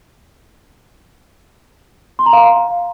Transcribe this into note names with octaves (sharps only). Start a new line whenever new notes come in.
C6
A#5
F5